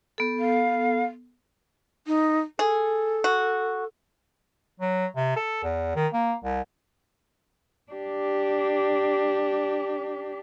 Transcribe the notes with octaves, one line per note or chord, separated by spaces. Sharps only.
B3 A4
F5
D#4
G#4 A4
F#4
F#3
C3
A4
E2
D#3
A#3
C2
D4 G4